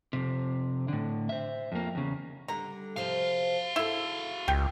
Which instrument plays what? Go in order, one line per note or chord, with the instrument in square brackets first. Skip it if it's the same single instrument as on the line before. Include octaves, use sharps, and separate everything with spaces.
[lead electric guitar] F2 C3
A2 D3
C5 E5
F2 A#3
E2 C#3
[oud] D3 G3 [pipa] A#5
[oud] C3 F3 C5 [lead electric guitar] F#4 F5
[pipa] E4 [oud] G#4 A4
[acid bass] C#2 [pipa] G4